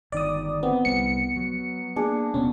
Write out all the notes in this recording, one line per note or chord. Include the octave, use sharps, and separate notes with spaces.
G1 D#3 D5 D#6
B3 C4
C2 G3 C#7
F#3
A#3 D4 G#4
D#1 C3 B3 C#4